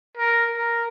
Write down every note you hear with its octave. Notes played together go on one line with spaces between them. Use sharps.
A#4
A#4